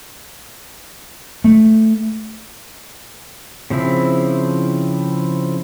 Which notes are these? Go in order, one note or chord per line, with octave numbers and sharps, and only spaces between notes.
A3
C#3 F3 C4 E4